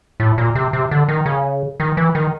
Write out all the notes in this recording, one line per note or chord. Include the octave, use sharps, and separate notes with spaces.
A2
A#2
C3
C3
D3
D#3
C#3
D#3
E3
D#3